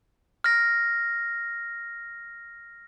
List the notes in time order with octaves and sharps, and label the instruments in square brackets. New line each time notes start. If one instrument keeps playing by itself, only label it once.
[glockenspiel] F6 A#6